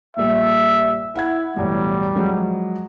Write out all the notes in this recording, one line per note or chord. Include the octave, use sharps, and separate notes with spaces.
A#1 A#2 G3 E5
E4 E5 F#5 G#6
B1 E2 A2 G3
F3 F#3 G#3